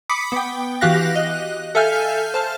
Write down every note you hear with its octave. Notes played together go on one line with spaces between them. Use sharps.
B5 D6 D#6 B6 C#7
B3 G5
E3 F#4 G4 F5 F#6 A#6
D#5 F#6
A4 E5 F5 G#5 F6 G6
C5 A5 F6